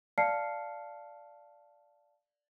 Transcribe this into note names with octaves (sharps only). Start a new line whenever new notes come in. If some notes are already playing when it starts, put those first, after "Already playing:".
D5 F5 A5 F6 C7 C#7